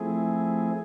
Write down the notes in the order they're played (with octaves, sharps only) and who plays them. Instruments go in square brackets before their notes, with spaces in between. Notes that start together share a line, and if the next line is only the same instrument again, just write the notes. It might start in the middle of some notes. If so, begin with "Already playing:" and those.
Already playing: [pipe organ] F3 A3 C4 E4 G#4